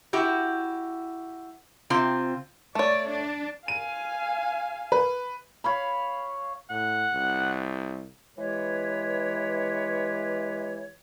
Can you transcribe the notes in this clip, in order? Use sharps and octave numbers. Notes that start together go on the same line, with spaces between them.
E4 F#4 G4
C3 C4 F4
A3 C#5 D5
D4
F5 G#5 D#7
B4
C#5 F5 B5
A2 F#5
C2
E3 G#3 G4 B4 C#5